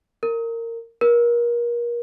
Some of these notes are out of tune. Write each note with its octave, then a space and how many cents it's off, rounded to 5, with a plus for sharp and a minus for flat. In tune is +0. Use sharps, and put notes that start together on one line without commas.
A#4 -20
A#4 +30